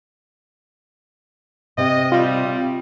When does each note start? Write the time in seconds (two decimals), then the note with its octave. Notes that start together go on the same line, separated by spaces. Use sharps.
1.78 C3 D#5
2.12 G3 F4